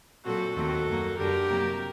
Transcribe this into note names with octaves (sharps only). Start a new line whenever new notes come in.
A#2 F#3 C4 F#4 A4
D#2 D#3 A3 C4 F#4 A4
F#2 F#3 A#3
F#2 D3 G3 G4 A#4
C3 F#3 A#3